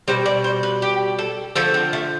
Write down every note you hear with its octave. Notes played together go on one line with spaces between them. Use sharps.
B2 G3 C5
D5
C5
B4
G4
A4
D3 F3 A3 A4
C4
A3